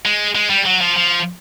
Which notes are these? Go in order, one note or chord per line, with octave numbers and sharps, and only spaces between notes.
G#3
G#3
G3
F#3
F3
F3